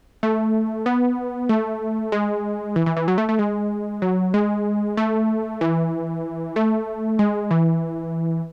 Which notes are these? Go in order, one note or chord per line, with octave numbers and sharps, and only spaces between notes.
A3
B3
A3
G#3
E3
E3
E3
F#3
A3
A3
G#3
F#3
G#3
A3
E3
A3
G#3
E3